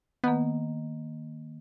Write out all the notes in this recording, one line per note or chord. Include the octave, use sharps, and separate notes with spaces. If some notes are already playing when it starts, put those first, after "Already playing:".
D#3 A#3 B3